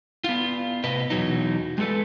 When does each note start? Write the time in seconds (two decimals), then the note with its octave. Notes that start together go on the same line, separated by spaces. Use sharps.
0.24 B3 F4
0.84 A2 C3 B4 D#5
1.10 E2 B2 F#3 D#4
1.78 G#3 A3 G#4 A4 B4